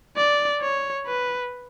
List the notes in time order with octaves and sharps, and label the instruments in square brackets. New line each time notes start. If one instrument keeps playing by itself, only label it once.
[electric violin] D5
C#5
B4